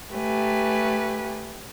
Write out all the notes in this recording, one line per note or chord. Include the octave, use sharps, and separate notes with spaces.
A3 G4 B4 G#5